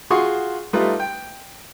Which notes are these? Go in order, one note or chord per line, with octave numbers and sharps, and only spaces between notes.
F4 F#4 G#4 C6 C#6 D#6
G3 A3 D#4 F4 B4
G5